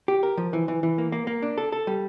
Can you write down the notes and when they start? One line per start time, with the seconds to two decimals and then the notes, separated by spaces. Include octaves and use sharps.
0.08 G4
0.23 A#4
0.37 F3
0.53 E3
0.68 E3
0.83 E3
0.98 A#3
1.12 A#3
1.27 A#3
1.42 D4
1.58 A4
1.72 A4
1.87 G3